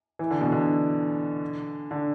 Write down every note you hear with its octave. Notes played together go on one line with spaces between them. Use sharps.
E3
D3
B2
D3
D3